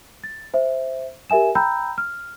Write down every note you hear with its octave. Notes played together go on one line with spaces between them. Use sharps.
A6
C5 E5
G4 A#4 E5 G#5 E7
G5 A#5 B5 E6 G6
F6